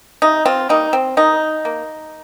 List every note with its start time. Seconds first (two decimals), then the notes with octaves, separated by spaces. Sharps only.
0.22 C3 D#4
0.46 C4 F4
0.69 G3 A#3 D#4
0.93 C4
1.17 D#3 D#4
1.65 A#3